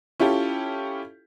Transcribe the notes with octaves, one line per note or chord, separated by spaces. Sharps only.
C#4 E4 F4 G4 A4